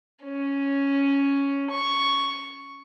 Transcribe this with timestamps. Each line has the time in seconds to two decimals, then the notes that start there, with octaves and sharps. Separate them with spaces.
0.24 C#4
1.71 C#6